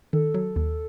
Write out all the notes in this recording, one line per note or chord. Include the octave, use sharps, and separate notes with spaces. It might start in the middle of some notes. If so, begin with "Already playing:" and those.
D#3 A4
F#3
D#2